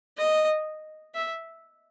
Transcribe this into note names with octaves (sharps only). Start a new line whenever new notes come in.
D#5
E5